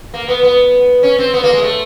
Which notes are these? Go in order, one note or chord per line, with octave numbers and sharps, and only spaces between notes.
A#3
B3
B3
C#4
C4
B3
A#3
G#3
A3